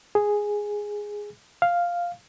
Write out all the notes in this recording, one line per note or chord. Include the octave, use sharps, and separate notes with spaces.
G#4
F5